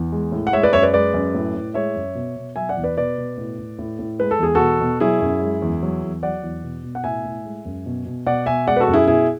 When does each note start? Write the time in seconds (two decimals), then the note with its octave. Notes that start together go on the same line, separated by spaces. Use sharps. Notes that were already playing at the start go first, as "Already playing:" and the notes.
Already playing: E2
0.12 G#3
0.32 A2
0.47 F#5
0.53 G#3 C#5 E5
0.63 B4 D5
0.73 F#2 C#5 E5
0.83 B4 D5
0.93 G#3 B4 D5
1.14 F#2
1.34 A2
1.55 A2
1.74 G#3 C#5 E5
1.96 F#2
2.15 B2
2.36 B2
2.56 F#3 E5 G#5
2.69 D5 F#5
2.77 E2
2.84 B4 D5
2.97 B2 B4 D5
3.18 B2
3.37 A2
3.58 A2
3.79 A2
3.99 A2
4.19 G#3 B4
4.31 A4
4.39 E2 G#4
4.55 B2 F#4 A4
4.80 B2
5.00 F#3 E4 G#4
5.21 F#2
5.42 G#3
5.62 E2
5.83 F#3
6.03 E2
6.23 F#3 D5 F#5
6.43 E2
6.63 B2
6.83 B2
6.95 F#5
7.04 A2 E5 G#5
7.25 A2
7.45 G#3
7.65 F#2
7.86 B2
8.06 B2
8.27 B2 D5 F#5
8.46 B2 E5 G#5
8.67 G#3 D5 F#5
8.76 B4
8.80 F#4 A4
8.88 F#2
8.94 E4 G#4
9.07 B2 E4 G#4